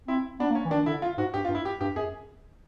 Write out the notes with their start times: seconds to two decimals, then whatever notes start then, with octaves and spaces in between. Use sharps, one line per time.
0.08 C4 E4
0.40 B3 D4
0.50 A#3
0.55 C#4
0.65 E3
0.70 D#3 D4
0.86 D3 E4
1.02 F4
1.18 G#2 F#4
1.34 G2 G4
1.45 F4
1.49 G2
1.55 E4
1.65 G4
1.81 G2 G4
1.96 F#2 G#4